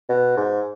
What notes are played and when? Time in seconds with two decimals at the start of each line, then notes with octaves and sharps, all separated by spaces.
0.09 B2
0.37 G#2